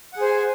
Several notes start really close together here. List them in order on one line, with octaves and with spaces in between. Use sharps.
F#5 G#4 C5 G#5